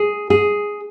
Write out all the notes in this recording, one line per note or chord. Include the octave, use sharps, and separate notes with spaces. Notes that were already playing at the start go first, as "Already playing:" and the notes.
Already playing: G#4
G#4